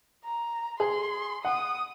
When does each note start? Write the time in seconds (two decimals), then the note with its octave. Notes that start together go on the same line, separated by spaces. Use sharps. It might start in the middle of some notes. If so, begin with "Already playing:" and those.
0.25 A#5
0.80 G#4 C6
1.45 F#5 D#6